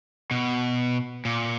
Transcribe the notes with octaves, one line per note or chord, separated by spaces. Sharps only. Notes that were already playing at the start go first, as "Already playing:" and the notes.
B2
A#2